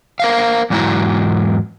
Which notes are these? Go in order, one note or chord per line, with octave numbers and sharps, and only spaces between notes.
A#4 C5 F5
E2 G#2 F#3 D#4 E4 A#5